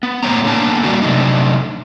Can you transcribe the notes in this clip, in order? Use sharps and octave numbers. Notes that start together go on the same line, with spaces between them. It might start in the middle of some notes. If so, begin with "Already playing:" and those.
B3
A2 A#3 C5 C#5 G5 A#5
D3 A#3 B3 D4 A5 A#5
G3 A#3 C#4 D4 F#4 G4
C3 F#3 A3 D4 D#4